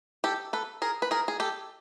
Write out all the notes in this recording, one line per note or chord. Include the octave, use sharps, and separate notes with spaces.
G4 A4
A4 B4
G#4 A#4
B4
G#4 A#4
G#4
G4 A4